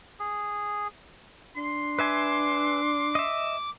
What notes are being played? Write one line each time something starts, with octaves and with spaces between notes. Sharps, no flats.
G#4
D4 C6
B4 E5 G#5 D6
D#5 E5